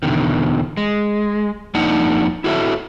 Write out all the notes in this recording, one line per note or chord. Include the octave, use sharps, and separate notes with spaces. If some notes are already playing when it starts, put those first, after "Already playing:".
E2 B2 D3 D#3
G#3
F2 A#3 D4 D#4 F#5
E4 F#4 A4 C#5 E5